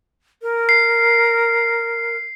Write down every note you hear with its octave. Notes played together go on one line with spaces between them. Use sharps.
A#4
C7